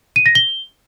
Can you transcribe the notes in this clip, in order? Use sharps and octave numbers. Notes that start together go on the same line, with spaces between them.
D#7
A#6
G7